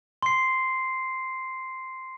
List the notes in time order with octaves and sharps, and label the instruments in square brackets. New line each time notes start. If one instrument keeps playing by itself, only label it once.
[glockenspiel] C6 C7